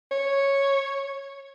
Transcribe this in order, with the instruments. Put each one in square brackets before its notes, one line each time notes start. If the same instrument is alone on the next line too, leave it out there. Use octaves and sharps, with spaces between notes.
[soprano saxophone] C#5